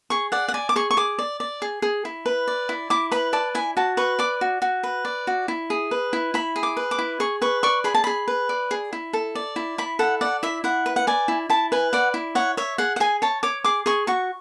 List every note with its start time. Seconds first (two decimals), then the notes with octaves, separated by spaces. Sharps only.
0.10 G#4 C#6
0.32 D5 F#5
0.48 F#5
0.54 D5 G#5
0.69 D6
0.76 G#4 C#6
0.91 C#6
0.97 G#4 D6
1.19 D5
1.40 D5
1.62 G#4
1.82 G#4
2.05 E4
2.26 B4
2.47 D5
2.69 E4
2.90 E4 D6
3.11 B4 B5
3.33 D5 A5
3.55 E4 G#5
3.77 F#4 A5
3.97 B4 C#6
4.19 D5 D6
4.41 F#4
4.62 F#4
4.83 B4
5.05 D5
5.27 F#4
5.48 E4
5.70 G#4
5.91 B4
6.13 E4
6.34 E4 B5
6.56 G#4
6.63 D6
6.77 B4
6.91 D6
6.98 E4
7.20 G#4 C#6
7.42 B4 C#6
7.63 D5 C#6
7.84 G#4 B5
7.94 A5
8.04 G#4 B5
8.28 B4
8.49 D5
8.71 G#4
8.93 E4
9.13 A4
9.35 D5
9.56 E4
9.78 E4 B5
9.99 A4 F#5
10.21 D5 F#5
10.43 E4 E5
10.64 E4 F#5
10.86 B4
10.96 F#5
11.07 D5 G#5
11.28 E4
11.50 E4 A5
11.72 B4 G#5
11.93 D5 F#5
12.14 E4
12.35 C#5 F#5
12.57 C#5 E5
12.78 G#4 F#5
12.96 F#5
13.00 G#4 G#5
13.22 C#5 A5
13.43 C#5 D6
13.64 G#4 D6
13.86 G#4 C#6
14.07 F#4 C#6